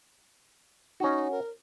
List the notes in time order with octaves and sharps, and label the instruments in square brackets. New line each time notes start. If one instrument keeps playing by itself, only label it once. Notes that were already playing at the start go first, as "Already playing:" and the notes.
[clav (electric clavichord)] C#4 F#4 [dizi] D#4
[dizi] A#4